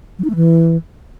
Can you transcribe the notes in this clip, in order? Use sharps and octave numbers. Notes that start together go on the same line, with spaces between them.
F#3
D#4
A3
E3